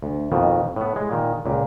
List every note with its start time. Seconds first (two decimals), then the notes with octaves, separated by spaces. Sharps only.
0.02 D2
0.32 F2 B2 D#3
0.76 A2 B3
0.96 G#3
1.11 A#2 D#3
1.46 C#2 A#2